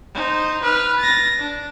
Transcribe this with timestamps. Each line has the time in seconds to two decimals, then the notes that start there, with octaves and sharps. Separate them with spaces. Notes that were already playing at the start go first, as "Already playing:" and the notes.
0.14 D#4 C5
0.63 B4 F6
0.99 A6 A#6
1.40 D4